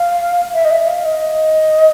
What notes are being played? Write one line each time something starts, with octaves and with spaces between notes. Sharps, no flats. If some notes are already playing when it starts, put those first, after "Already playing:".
Already playing: F5
E5
D#5
E5
F5
D#5